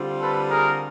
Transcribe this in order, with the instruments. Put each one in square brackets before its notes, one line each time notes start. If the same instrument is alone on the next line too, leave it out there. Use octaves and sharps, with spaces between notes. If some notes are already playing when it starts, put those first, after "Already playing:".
Already playing: [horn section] D3 G3 C4 F4
[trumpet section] A4 B4
G#4 A#4